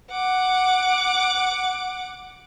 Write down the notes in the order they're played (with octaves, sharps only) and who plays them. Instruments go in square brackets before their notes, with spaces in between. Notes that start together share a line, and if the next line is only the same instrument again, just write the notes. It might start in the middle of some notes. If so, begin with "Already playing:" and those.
[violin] F#5 D6